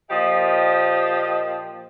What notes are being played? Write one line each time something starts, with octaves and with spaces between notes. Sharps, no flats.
A#2 F3 G4 D#5